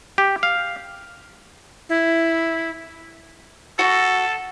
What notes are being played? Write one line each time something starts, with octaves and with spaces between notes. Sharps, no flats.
G4
F5
E4
F#4 A4